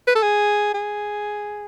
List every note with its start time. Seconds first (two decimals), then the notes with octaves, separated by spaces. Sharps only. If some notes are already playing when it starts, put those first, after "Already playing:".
0.08 B4
0.15 A4
0.23 G#4
0.74 G#4